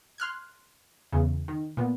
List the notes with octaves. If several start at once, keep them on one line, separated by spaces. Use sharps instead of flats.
C6 F6 F#6 G#6
E2 C#3
D#3
A#2 B3